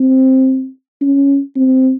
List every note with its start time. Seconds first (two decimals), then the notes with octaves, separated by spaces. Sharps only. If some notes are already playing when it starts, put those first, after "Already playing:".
Already playing: C4
1.01 C#4
1.56 C4